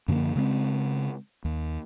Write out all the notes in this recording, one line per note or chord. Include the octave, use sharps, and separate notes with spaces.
F#2 D3 F3 A#3
C#3 G#3 C4
D#2